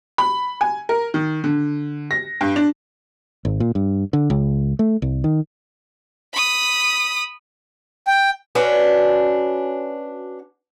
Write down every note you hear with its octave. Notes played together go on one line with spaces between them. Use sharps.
B5
G#5
A#4
D#3
D3
A#6
G2
D4
G#1
A#2
G2
D3
C#2
A3
C2
D#3
B5 D#6
G5
C#4 D4 F#4 B4